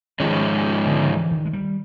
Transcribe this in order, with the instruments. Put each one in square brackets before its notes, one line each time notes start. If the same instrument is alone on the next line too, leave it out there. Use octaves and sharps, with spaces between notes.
[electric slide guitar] G#2 F3 G#3 C#4 [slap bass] D#3
[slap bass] D3
E3
D#3
G#3
G3